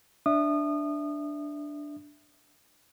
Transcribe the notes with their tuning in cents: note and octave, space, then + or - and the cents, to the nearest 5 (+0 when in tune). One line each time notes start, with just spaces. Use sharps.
D4 +0 E5 +0 D#6 -30